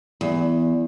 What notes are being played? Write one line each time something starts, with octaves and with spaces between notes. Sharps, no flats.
E2